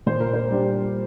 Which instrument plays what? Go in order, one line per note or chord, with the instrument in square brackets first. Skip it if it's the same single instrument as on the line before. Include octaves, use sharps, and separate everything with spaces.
[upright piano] A#2 C5
A#4
C5
G3 D4